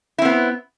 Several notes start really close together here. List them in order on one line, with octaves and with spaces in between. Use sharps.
E4 C4 B3